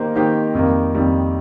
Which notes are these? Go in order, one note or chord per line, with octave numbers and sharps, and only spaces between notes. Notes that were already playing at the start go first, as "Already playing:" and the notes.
Already playing: D#3 A#3 D#4 G4 C5
D#3 A#3 D#4 G4 C5
F2 D#3 G3 A#3
F2 D#3 G3 A#3